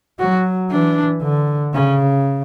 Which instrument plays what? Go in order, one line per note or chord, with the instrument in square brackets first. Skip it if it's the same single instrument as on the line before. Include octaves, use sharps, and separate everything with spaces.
[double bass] F#3 [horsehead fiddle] F#4
[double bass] E3 [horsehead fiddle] D4
[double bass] D3
[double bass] C#3 [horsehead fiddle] C#4